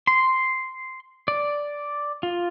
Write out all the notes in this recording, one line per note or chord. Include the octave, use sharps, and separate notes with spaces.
C6
D5
F4